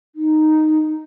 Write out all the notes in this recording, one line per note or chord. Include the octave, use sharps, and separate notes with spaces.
D#4